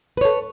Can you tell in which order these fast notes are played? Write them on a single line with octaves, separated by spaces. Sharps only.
B4 C#5 A4